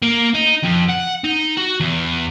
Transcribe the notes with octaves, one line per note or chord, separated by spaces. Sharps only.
A#3
D#4
F2
F#5
D#4
F#4
E2